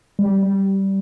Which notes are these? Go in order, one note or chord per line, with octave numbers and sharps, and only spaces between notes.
G3
G3